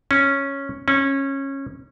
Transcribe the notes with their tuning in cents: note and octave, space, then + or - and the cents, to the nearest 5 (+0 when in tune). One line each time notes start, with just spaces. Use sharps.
C#4 -5
C#4 -20